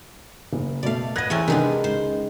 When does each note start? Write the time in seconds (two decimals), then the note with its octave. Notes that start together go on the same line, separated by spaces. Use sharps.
0.53 F#1
0.83 B2 A3 D5 F5
1.16 B3 D#5 F#6 G#6 A#6
1.30 E2 C4 C#4 E4
1.48 C3 D#3 G#3 B3 D4
1.84 C#2 C5